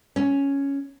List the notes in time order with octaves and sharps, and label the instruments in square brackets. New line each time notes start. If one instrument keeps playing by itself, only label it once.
[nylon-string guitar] C#4